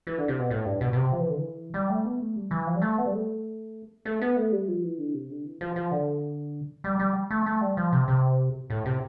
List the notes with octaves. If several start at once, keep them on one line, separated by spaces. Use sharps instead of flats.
E3
D3
C3
B2
A2
G2
B2
B2
C3
F3
E3
D3
E3
G3
A3
B3
A3
G3
E3
F3
G3
A3
B3
G3
A3
A3
B3
A3
G3
F3
E3
D3
C3
D3
E3
F3
F3
D3
G3
G3
A3
A3
G3
F3
C3
C3
A2
C3